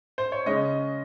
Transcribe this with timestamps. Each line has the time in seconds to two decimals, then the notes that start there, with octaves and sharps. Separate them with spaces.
0.18 C5
0.32 C#5
0.46 C#3 G#3 C#4 D#5